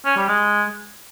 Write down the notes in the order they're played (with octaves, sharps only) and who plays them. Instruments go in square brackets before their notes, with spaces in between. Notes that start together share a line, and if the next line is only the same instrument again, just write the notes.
[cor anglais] C#4
G3
G#3